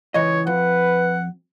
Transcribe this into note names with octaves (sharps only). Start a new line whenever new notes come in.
C#2 E3 C#5 D#5
F2 B4 F#5